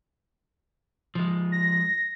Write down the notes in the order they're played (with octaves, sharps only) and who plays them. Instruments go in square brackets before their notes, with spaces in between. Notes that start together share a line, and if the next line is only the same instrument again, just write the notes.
[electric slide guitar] F3 G#3
[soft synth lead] A#6